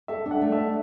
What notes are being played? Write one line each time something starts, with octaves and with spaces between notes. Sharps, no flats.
A4 E5
D4
F#5
A3
E5
D5